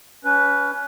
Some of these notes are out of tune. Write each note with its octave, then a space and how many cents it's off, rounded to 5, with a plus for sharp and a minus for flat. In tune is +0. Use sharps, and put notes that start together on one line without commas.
C#4 +30 B4 +0